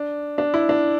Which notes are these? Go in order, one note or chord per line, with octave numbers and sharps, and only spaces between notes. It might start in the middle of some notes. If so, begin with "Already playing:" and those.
Already playing: D4
D4
E4
D4